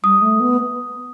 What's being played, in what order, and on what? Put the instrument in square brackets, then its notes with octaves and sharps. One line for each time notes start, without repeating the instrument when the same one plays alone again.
[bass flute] G3 [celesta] D#6
[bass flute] A3
B3